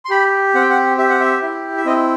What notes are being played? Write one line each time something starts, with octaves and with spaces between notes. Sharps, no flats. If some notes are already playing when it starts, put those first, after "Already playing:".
C6
G4 B5
C4 F#5
G5
F#5
G4 E5
F#5
E5
E4
E5
C4 D#5